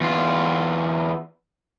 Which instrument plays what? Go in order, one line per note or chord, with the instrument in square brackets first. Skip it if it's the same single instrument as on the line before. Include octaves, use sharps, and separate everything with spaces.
[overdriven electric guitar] E2 F4